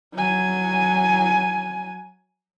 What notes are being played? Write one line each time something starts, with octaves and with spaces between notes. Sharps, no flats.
F#3 G#5